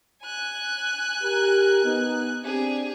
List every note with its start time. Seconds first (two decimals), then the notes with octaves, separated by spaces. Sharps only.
0.24 G#5 F#6
1.23 G4 A#4
1.85 B3 D#4
2.43 C4 D4 G4 G#4